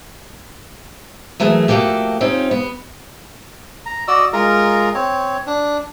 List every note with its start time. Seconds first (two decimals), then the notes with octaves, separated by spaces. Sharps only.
1.40 E3 F#3 A3 G#4 A#4
1.68 F3 A3 A#3 F#4 G4 A4
2.20 C4 C#4 D#4 F4
2.51 B3
3.86 A#5
4.08 F#4 D5 D#5 E6
4.33 G#3 F4 A#4 A#5
4.95 C4 C#5
5.47 D4